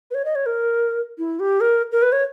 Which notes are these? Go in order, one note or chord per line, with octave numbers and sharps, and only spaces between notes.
B4
C#5
D#5
C#5
A#4
E4
G4
A#4
A#4
B4
C#5